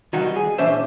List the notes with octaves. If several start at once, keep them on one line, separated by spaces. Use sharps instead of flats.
D#3 F#3 G3 D#4 F#4
G#4
A#2 E3 C#4 D4 C5 E5